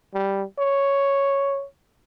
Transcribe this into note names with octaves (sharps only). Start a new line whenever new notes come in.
G3
C#5